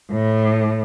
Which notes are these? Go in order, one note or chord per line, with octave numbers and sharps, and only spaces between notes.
A2